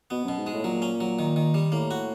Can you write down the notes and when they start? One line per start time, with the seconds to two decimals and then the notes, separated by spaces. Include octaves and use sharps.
0.10 B2 B3
0.24 F#2 B2
0.38 G#2
0.47 G#3
0.54 A2
0.64 A#2 F#3
0.82 C#4
1.01 F#3
1.19 D#3
1.36 D#3
1.54 G3
1.72 A2 A#3
1.91 F#4